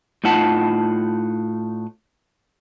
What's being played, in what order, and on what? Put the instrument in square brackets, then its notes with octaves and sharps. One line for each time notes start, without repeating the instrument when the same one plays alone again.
[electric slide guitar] A2 D#4 F4 F#5 A5